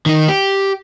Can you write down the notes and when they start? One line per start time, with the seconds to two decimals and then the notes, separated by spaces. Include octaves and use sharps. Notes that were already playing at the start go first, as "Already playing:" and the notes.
0.06 D#3 D#4
0.28 G4